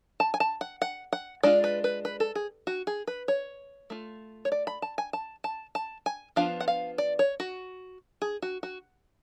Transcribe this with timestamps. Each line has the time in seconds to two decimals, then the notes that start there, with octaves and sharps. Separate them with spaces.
0.20 A5
0.34 G#5
0.40 A5
0.61 F#5
0.82 F#5
1.13 F#5
1.43 G#3 D4 F4 D5
1.64 B4
1.84 B4
2.05 B4
2.20 A4
2.35 G#4
2.67 F#4
2.87 G#4
3.07 B4
3.28 C#5
3.90 A3 F4
4.45 C#5
4.52 D5
4.67 B5
4.82 A5
4.98 G#5
5.13 A5
5.44 A5
5.75 A5
6.06 G#5
6.36 F3 B3 D4 F4 F5
6.60 F#5
6.68 F5
6.98 D5
7.19 C#5
7.40 F#4
8.22 G#4
8.42 F#4
8.63 F#4